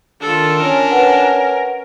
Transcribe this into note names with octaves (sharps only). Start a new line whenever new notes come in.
D#3 D4 F4 A4
C#4 A#4
C#4 B4 F#5